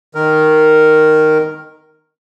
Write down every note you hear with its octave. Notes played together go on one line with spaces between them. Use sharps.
D#3 A#4